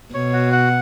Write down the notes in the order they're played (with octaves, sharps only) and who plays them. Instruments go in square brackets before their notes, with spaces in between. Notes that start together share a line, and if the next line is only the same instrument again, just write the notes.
[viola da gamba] B2 [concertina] C#5
[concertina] F#4
F#5